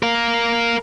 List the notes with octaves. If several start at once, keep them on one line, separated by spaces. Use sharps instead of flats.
A#4 F5